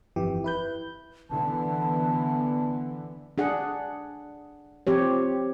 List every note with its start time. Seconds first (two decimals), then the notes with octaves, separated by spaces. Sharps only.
0.16 G1 F2 E3 G4
0.44 E4 B4 G6
1.31 D3 E3 B3 A5
3.38 D4 G#4 F#5
4.87 F3 C4 G4 C#5